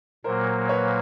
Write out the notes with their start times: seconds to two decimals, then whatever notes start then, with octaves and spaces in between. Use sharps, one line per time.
0.24 A#2 F#3 A#3 A#4 C5
0.69 B4 C#5